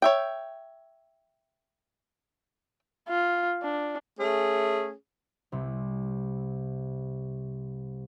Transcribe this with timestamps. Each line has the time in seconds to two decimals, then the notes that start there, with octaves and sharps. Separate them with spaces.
0.02 C#5 E5 G5
3.09 F4
3.63 D4
4.20 A3 C#4 G#4
5.52 C2 C3